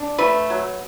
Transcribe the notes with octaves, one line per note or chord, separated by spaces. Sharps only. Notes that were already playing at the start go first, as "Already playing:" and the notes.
Already playing: D4
A3 B4
F#3